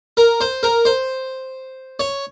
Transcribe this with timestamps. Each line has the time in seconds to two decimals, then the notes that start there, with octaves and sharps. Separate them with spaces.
0.17 A#4
0.41 C5
0.63 A#4
0.85 C5
2.00 C#5